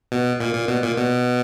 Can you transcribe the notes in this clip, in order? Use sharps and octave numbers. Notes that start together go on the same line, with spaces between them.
B2
A#2
A#2
B2
A#2
B2